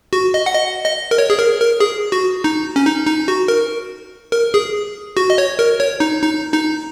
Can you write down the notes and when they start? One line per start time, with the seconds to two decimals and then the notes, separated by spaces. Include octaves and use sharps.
0.13 F#4
0.34 D#5
0.46 F#5
0.54 D#5
0.86 D#5
1.11 A#4
1.18 C#5
1.30 G#4
1.39 A#4
1.60 A#4
1.80 G#4
2.12 F#4
2.44 D#4
2.76 C#4
2.86 D#4
3.07 D#4
3.28 F#4
3.48 A#4
4.32 A#4
4.54 G#4
5.17 F#4
5.30 D#5
5.38 C#5
5.59 A#4
5.80 C#5
6.00 D#4
6.22 D#4
6.53 D#4